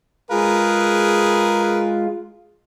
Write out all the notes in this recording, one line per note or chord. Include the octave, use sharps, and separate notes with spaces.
G#3 F4 G#4 A#4 B4